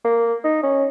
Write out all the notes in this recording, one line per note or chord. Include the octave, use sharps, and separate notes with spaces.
A#3
D#4
C#4